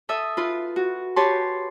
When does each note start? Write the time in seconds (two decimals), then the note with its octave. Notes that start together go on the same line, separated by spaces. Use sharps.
0.09 A4 E5 D#6
0.37 F4 B4
0.76 F#4
1.16 G4 B4 C#5 A5 C6